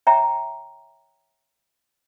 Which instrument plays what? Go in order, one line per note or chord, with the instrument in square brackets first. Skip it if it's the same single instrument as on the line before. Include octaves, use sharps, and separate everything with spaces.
[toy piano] C#5 E5 G5 A#5